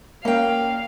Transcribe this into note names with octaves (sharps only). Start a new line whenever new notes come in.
A#3 C#4 F5 G5